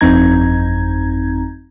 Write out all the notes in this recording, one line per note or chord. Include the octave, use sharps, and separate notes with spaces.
G1 F2 C4 D#4 A#5 G#6